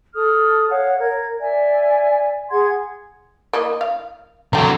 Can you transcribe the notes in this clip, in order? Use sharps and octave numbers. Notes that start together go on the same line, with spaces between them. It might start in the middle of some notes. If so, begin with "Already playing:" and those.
A4 D#6 F6
C#5 F5 F#5
A#4 G#6
D5 E5 G#5
G#4 F#5 C6 G#6
A#3 E4 D#5
F5
D3 F#3 G5 A#5